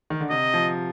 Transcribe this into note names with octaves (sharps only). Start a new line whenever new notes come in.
D#3
D3
C3 D#5
F3